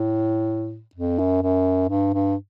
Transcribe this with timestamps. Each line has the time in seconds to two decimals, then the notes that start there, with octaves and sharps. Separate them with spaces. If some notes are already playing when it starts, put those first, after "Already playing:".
Already playing: A2
0.95 F2
1.19 F#2
1.42 F#2
1.89 G2
2.13 G2